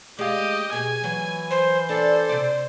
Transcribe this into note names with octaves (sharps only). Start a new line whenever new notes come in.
G#3 G4 D#5 F5
B2 G#4 G#5
E3 F#3
C5
D4 A4 C5
C3 D5